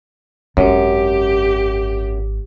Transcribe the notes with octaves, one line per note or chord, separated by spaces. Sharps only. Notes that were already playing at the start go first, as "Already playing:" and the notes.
G#1 F#2 G4